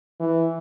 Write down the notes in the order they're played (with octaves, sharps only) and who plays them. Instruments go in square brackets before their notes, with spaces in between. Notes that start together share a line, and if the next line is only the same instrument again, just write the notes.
[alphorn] E3